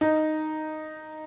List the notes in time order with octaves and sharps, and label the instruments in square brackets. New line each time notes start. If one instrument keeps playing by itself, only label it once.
[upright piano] D#4